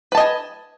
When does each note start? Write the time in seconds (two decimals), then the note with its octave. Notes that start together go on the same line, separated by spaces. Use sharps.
0.12 B4
0.15 A5
0.17 D#5
0.20 G#5